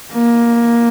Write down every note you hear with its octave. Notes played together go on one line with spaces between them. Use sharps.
A#3